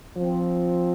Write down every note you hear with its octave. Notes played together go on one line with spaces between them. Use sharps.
F3 C4